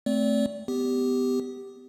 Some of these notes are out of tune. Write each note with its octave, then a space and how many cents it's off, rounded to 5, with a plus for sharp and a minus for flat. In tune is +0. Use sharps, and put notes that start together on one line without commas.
A3 +0 C4 +0 D5 -30
B3 +25 G4 +0